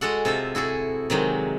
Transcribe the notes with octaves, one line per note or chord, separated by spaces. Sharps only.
G#3 F#4 A4 F#5
C3 F4 A4 E5
E4 F#4 G#4 A4
C3 D#3 F#3 G#3